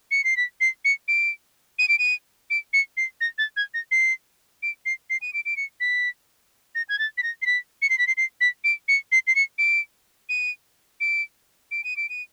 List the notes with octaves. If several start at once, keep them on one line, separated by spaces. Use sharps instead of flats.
C#7
C7
B6
C7
C#7
D7
D#7
D7
D#7
D7
C#7
C7
A#6
A6
G#6
A#6
C7
D7
C7
C7
D#7
D7
D7
C#7
B6
A#6
G#6
A6
B6
A#6
C7
B6
C#7
C7
B6
C7
C7
B6
D7
C#7
C7
C7
C#7
D7
D#7
D7
D7
D#7
D7
D#7